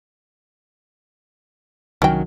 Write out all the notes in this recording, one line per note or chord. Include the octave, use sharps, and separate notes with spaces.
C2 D#3 F#3 C#4 G5